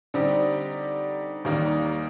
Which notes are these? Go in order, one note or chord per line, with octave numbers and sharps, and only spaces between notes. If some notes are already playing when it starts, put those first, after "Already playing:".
D3 G3 C4 D#4 G4
D#2 D#3 G3 A#3 D#4